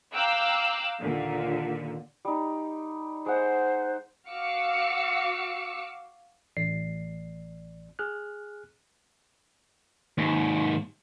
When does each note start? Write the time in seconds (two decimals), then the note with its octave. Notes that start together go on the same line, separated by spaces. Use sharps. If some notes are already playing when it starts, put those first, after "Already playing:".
0.13 F5 G5 A#5 D6 E6 F#6
1.00 D#2 A#2 D3
2.25 G3 D#4
3.26 G#3 C5 F#5
4.29 F#4 F5 D6 E6 C#7
6.57 A1 D5 C7
7.99 G#4 F6 F#6
10.18 D#2 G#2